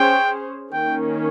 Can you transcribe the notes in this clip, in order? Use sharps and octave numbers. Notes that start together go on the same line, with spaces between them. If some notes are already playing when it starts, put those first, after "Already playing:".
Already playing: C#4 G#4 C5 G5
D#3 A#3 C#4 G5